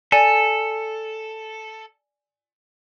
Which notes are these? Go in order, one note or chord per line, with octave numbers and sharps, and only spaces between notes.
A4 D5 G#5